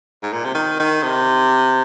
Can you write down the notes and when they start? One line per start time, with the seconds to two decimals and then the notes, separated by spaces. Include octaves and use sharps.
0.22 G#2
0.33 A#2
0.45 C3
0.54 D#3
0.80 D#3
1.03 C3